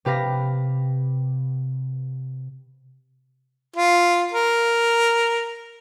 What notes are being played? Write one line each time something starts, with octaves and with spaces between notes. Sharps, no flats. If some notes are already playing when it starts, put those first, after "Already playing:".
C3 G4 B4 F5 A#6
F4
A#4